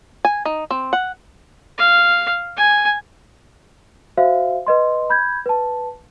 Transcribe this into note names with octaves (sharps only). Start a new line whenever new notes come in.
G#5
D#4
C4
F#5
F5
G#5
F#4 C5 E5 F5
B4 D#5 C6
B5 G6 G#6
B4 A5